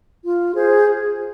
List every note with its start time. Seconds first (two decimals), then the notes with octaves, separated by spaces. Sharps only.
0.25 F4
0.54 G#4 C5